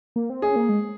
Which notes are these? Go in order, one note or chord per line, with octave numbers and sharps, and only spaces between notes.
A#3
C4
C#4 G#4
A#3
G#3